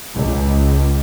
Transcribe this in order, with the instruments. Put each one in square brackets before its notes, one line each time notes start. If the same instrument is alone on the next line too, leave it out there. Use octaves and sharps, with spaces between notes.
[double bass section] C#2